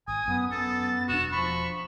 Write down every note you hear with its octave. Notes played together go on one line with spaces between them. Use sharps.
G#1 G#5 D#6
F#2 B3
B3 A4 A6
E1 D4 F#4 E7
F3 B5 C#6